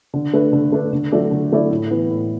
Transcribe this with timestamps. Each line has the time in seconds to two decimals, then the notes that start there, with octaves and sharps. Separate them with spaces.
0.14 D3
0.33 A3 D4 B4
0.53 D3
0.72 A3 D4 B4
0.93 D3
1.12 F#3 A3 E4 D5
1.31 D3
1.52 F#3 A3 E4 D5
1.71 A2
1.91 E3 B3
2.10 A2